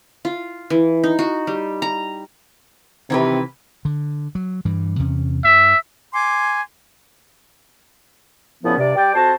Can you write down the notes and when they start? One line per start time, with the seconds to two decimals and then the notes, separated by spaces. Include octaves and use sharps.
0.25 F4
0.70 E3
1.04 D#4
1.19 F#4
1.47 G3
1.82 A#5
3.10 C3 D#3 E3 B4
3.85 D3
4.35 F#3
4.65 G2 E3 G3
4.99 E2 C3 C#4
5.44 G2 E5
6.12 G#5 C6 D6
8.64 A#2 C#3 F3 B3 C#4 E4
8.77 G2 C3 D5
8.96 G3 D5 G5
9.14 F2 C4 F#4 C5 A5